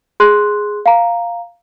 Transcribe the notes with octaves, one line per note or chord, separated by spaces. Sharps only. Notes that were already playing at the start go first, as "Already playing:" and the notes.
G#4 C6 F#6
F5 A#5